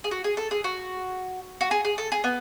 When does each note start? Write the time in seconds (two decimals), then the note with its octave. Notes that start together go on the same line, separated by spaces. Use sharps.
0.04 G#4
0.11 F#4
0.24 G#4
0.37 A4
0.51 G#4
0.64 F#4
1.61 F#4
1.71 G#4
1.85 G#4
1.98 A4
2.12 G#4
2.24 B3